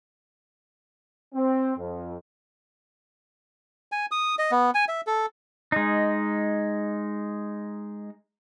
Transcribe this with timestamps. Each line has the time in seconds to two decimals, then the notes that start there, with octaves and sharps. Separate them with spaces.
1.34 C4
1.78 F2
3.92 G#5
4.11 D#6
4.39 D#5
4.51 B3
4.75 G#5
4.88 E5
5.07 A4
5.72 G#3 D#4